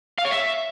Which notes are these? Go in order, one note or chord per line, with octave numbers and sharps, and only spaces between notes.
F5
C#5
E5